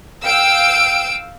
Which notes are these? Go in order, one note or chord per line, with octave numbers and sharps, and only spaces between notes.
F5 G5 E6 D7